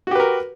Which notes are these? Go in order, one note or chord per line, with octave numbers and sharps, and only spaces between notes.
F#4 G4 A#4 B4